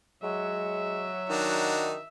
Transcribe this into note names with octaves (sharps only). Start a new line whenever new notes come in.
F#3 G#3 E5
D#3 D4 D#4 F#4